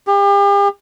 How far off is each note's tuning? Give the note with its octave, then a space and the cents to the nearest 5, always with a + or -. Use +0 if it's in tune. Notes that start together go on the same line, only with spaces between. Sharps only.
G4 +40